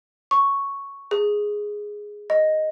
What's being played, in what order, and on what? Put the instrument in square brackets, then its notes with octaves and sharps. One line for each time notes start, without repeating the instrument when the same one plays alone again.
[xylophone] C#6
G#4
D#5